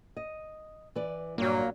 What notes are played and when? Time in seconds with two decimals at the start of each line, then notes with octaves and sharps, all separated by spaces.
0.17 D#5
0.95 E3 B4 D5
1.38 G2 A#2 F#3 A#3